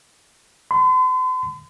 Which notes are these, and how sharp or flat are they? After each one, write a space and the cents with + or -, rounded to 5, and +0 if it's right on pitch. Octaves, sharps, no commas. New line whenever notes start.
C6 -45